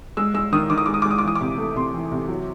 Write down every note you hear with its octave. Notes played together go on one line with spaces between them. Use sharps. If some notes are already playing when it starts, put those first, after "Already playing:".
G#3 E6
G#3 E6
D#3 D#6
D#3 D6
D#6
G#3 D6
D#6
D6
G#3
D#6
D6
E3 D#6
D6
C3
A3
C3 C6
E3
C3
F#3